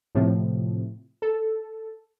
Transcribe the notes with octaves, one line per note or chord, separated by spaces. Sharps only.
A2 C3 F3
A4